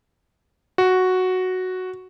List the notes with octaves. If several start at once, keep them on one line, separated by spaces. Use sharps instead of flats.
F#4